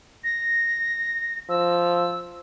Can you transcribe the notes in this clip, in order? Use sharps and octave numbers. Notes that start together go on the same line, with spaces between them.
A#6
F3 E6